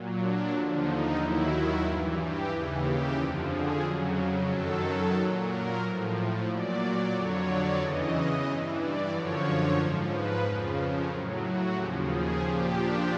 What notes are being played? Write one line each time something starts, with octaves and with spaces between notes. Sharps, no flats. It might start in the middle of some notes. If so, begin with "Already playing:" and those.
Already playing: A#2 F#3
D4
D#2 D3 F3
D#4
D#2 D#3 F#3 E4
G2 E3 F4
G4
D#2 C#3 E3
G4
F2 D3 F3
G#4
F2 C#3 F#3
F#2 D#3 F#3 A4
A#2 F#3
A#4
A2 F3
A#2 F#3 D5
F2 D3 F#3 C#5
D5
E2 C#3 E3 D#5
D#5
G2 E3
D5
F#2 D3 F3 C#5
G#2 F3 C5
B4
F2 C#3 F3
A2 F#3 A#4
F#4
D#2 C#3 F3 G4
G#4
A#2 F3 G4
D4